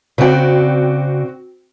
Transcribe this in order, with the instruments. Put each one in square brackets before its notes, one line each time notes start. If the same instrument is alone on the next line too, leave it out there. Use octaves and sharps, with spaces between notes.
[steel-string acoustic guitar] C#3 D5 [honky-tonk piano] C4 F#4 G5